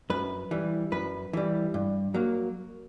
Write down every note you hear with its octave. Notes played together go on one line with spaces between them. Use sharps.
F#2 B4
E3 G3
F#2 B4
E3 G3
G2
F#3 A#3